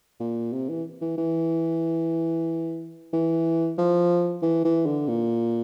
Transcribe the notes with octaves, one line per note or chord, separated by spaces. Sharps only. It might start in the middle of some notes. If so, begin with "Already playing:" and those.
A#2
C3
E3
E3
E3
E3
F3
E3
E3
D3
A#2